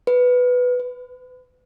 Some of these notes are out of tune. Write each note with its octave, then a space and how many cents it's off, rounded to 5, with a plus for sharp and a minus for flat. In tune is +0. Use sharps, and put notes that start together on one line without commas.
B4 +5
B4 +35